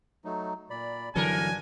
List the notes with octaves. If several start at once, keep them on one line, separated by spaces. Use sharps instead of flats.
F#3 A3 D#4
A#2 D5 B5
G2 D3 E3 F#3 D4 A4 A#4 G#5